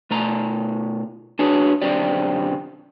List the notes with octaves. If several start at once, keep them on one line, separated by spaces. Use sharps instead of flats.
B2 A3 A#5
D4 F#4 G#4 B4 C#5
B1 F#2 D3 C4 G4 D5